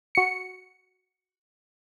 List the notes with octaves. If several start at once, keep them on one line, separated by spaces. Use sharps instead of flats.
F#4 C#7